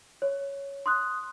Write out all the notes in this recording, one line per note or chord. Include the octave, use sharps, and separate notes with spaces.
C#5
C6 D#6 F#6